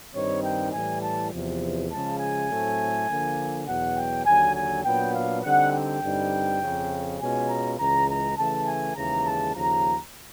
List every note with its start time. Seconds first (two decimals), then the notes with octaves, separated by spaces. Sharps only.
0.13 G2 D#3 G3 C4 D#4 C#5
0.43 G5
0.72 A2 E3 G3 G#5
1.01 A5
1.31 E2 C3 F3
1.90 C#3 F3 G#3 A5
2.19 G#5
2.49 A2 F#3 A3 C4
3.08 D3 F3 A#3
3.66 E2 B2 F#3 F#5
3.96 G5
4.25 D#2 D3 F#3 G#5
4.55 G#5
4.84 A#2 F#3 B3 D4 G5
5.14 F5
5.43 D3 G3 C4 D#4 F#5
5.73 G5
6.02 G2 D3 G3 C4 D#4
6.60 F2 C#3 F3
7.20 B2 G#3 C#4 F4 G#5
7.49 A#5
7.78 C#2 C#3 E3 G#3 A#5
8.08 A#5
8.37 C#3 E3 A3 A5
8.66 G#5
8.96 D#2 C#3 E3 G#3 A#5
9.25 A5
9.55 D#2 C#3 F3 A#5